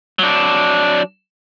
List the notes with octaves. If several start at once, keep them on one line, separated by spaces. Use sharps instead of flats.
F#3 D4